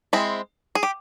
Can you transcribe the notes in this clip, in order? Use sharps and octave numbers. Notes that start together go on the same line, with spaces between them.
G#3 C4 E4
G#4
G4